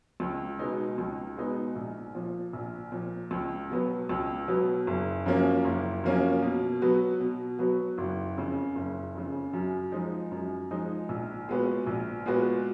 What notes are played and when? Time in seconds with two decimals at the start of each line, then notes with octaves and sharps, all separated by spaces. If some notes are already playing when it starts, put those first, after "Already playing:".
0.20 C#2
0.59 B2 G#3 B3 D#4
0.98 C#2
1.37 B2 G#3 B3 D#4
1.76 A#1
2.15 A#2 F3
2.53 A#1
2.92 A#2 F3
3.31 C#2
3.70 B2 F#3 B3
4.09 C#2
4.48 B2 F#3 B3
4.87 F#1
5.26 F#2 F3 A#3 C#4
5.65 F#1
6.04 F#2 F3 A#3 C#4
6.43 B2
6.82 F#3 B3 F#4
7.20 B2
7.59 F#3 B3 F#4
7.98 F#1
8.37 F2 C#3
8.75 F#1
9.15 F2 C#3
9.53 F#2
9.92 F3 G#3 D#4
10.31 F#2
10.71 F3 G#3 D#4
11.09 A#1
11.48 A#2 G#3 B3 F#4
11.87 A#1
12.26 A#2 G#3 B3 F#4